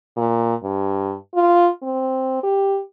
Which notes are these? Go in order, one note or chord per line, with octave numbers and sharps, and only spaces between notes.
A#2
G2
F4
C4
G4